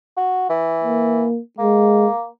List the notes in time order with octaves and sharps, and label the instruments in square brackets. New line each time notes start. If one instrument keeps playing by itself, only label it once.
[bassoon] F#4
E3
[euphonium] A#3
[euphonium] G#3 [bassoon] A#3